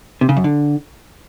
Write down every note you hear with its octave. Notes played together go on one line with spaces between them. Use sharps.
C3
C#3
F#2
D3